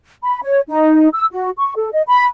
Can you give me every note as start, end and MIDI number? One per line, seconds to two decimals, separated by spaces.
0.23 0.40 83
0.43 0.60 73
0.68 1.08 63
1.14 1.26 88
1.32 1.50 66
1.58 1.73 85
1.76 1.89 69
1.92 2.02 75
2.08 2.25 83